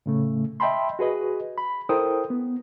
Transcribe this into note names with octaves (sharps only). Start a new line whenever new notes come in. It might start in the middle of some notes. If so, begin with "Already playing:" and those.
A2 C#3 A3
D#5 E5 G5 A5 B5 C6
F#4 G#4 B4 D#5
B5
E4 A4 A#4 C5 G5 D#6
B3